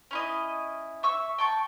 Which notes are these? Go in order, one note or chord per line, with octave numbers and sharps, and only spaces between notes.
C#4 E4 D#5
E5 C#6 E6
G5 A5 C#6